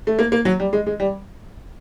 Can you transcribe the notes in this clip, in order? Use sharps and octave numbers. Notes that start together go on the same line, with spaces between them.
A3
A#3
A#3
F#3
G3
G#3
G#3
G3